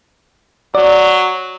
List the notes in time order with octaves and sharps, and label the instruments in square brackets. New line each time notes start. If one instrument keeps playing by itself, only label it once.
[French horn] F#3 [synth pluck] D5